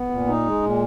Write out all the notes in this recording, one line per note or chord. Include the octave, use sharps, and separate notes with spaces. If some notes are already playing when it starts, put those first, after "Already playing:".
Already playing: B3
A#2
D#4
G#3
A#2